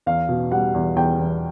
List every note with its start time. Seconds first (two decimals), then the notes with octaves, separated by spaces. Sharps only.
0.06 E2 F5
0.29 B2
0.52 G3 F#5
0.74 E2
0.96 E2 G5
1.19 E2